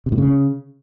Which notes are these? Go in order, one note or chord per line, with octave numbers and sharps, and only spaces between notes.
C3
A2
C#3